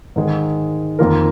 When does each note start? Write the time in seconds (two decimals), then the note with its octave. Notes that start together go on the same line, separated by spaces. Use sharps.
0.16 G#2 D#3 G#3
0.99 F2 D#3 A#3 F4 A#4